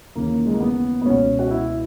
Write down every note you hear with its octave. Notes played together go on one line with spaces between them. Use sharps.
D#2 C#3 E3 A#3
G#3
A#3
B3
B3
C#2 B2 C#4
F#4
E4